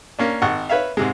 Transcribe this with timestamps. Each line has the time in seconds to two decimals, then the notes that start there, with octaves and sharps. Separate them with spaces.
0.19 A#3 C#4 D4
0.42 G#1 F#5 C#6
0.69 B4 C#5 E5 F5
0.97 G#2 C3 G#3